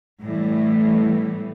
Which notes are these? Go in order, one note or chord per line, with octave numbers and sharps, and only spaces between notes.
A2 E3 G3 B3